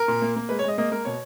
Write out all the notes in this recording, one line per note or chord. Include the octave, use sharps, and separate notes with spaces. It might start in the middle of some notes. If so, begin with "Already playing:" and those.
Already playing: A#4
A#2
A#3
A#3
G#3 B4
C#5
G#3 D#5
A#3 D#5
A#3 A#4
B2 C#5